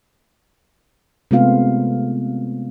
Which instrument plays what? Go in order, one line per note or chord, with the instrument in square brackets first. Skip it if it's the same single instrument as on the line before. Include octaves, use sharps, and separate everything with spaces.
[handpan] C3 G#3 A3 B3 F4 F5